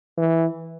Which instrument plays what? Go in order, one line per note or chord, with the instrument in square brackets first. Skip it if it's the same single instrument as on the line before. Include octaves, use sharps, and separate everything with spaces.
[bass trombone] E3